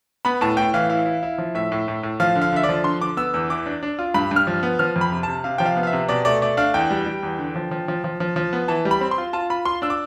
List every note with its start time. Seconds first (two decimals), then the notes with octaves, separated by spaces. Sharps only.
0.25 B3 B5
0.41 A2 A5
0.57 A2 G5
0.74 E3 F5
0.90 E4 F5
1.06 E4
1.23 E4
1.38 F3
1.55 A2 E5
1.72 A2
1.88 A2
2.03 A2
2.20 F3 F5
2.35 D3
2.41 F5
2.52 D3 E5
2.63 D5
2.69 F3
2.84 D3 C6
3.00 D3 D6
3.17 B3 E6
3.34 E2 E6
3.50 E3 D6
3.66 D4
3.83 D4
3.99 F4
4.14 G2 B5
4.31 G2
4.36 F6
4.47 F3
4.63 B3
4.79 F3 F6
4.96 F2
5.01 B5
5.12 C3
5.23 C3 A5
5.44 C3 F5
5.58 F3 G5
5.66 F5
5.76 B3
5.83 F5
5.87 E5
5.93 C3
6.09 B2 D5
6.25 A3 D5
6.41 A3 D5
6.57 D4 F5
6.74 E2 G5
6.91 G3
7.06 G3
7.23 E2
7.39 D3
7.56 F3
7.71 F3
7.88 F3
8.04 F3
8.20 F3
8.36 F3
8.53 B3
8.68 E3 A5
8.85 G3
8.91 B5
9.01 C4
9.11 C6
9.18 F4
9.33 F4 A5
9.50 F4 B5
9.65 F4 C6
9.82 D4 E6
9.90 D6